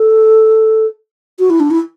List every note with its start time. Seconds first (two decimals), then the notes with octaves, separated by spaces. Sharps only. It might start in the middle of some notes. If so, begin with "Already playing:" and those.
Already playing: A4
1.39 F#4
1.50 E4
1.60 D4
1.71 E4